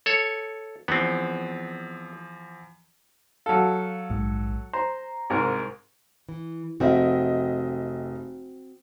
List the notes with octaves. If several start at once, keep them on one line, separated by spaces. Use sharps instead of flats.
A4 C#5
E2 F3 B3 C4
F#3 A4 F5
A#1 G#2
C5 A#5
C2 G#2 A#4
E3
F1 C4 F#4 D#5 E5